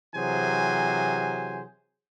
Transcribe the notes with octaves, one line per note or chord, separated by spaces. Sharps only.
C3 E3 F#3 G#4 C5 G#5